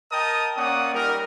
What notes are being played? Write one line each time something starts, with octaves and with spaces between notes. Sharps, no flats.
A#4 D#5 G5 A5 D#6
A#3 C#4 D5 F#5 D#6
G3 D#4 A#4